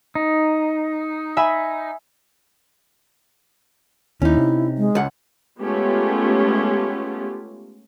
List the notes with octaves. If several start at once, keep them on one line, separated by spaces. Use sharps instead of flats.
D#4
E5 G#5 B5
D#2 C#4 D#4 E4
C3
G#3
C#2 F#5
G#3 A3 B3 C#4 F4 G4